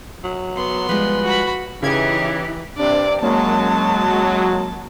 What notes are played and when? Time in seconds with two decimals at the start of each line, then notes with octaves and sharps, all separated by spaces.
0.24 F#3
0.57 B3 C6
0.89 F3 G3 G#3 B4
1.24 F#4 B5
1.83 C#3 E3 D#4 G4 G#6
2.78 G2 C3 D4 D5
3.22 F#2 F#3 G#3 A#3 C#4 A5